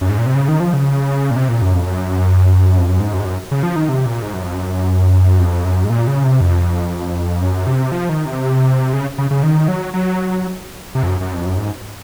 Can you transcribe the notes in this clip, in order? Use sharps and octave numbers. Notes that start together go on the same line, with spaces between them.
F#2
G#2
A#2
C3
C#3
D#3
F3
C#3
A#2
C3
A#2
F#2
F2
F#2
F2
F#2
G#2
F#2
G#2
F#2
C#3
F3
D#3
C3
A#2
G#2
F#2
F2
F#2
F2
F#2
G#2
A#2
C#3
C3
F2
F#2
C3
F3
D#3
C3
C#3
C#3
C#3
D#3
F#3
F#3
C3
F2
F#2
F#2
F2
F#2
G#2